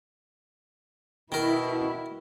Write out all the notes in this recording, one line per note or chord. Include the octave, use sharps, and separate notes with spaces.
B2 D#3 E4 A#4